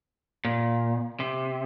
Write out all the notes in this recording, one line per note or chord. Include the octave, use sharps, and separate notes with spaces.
A#2
C3